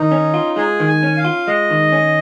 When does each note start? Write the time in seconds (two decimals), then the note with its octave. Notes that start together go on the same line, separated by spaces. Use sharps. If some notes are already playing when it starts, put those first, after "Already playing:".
Already playing: D#3 D#4
0.12 C#4
0.34 F4
0.56 G#3 G#4
0.80 D#3
0.87 G#5
1.03 C#4
1.17 F5
1.25 F4
1.47 G#3 D#5
1.70 D#3
1.92 C#4